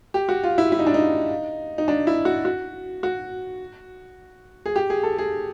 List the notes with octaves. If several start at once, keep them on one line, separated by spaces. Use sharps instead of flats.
G4
F#4
F4
E4
E4
D#4
D4
D#4
D#4
D4
E4
F#4
F#4
F#4
G#4
G4
G#4
A4
G#4